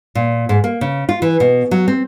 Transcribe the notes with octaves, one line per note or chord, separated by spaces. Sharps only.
A#2
G#2
A#3
C#3
F4
E3
B2
F#3
C4